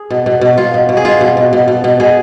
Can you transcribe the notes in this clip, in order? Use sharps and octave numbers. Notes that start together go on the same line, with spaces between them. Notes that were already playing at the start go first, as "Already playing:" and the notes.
Already playing: G#4
B2
B2
B2
B2 F4
B2
B2
G#4
B2 F4
B2
B2
B2
B2
B2
B2 G#4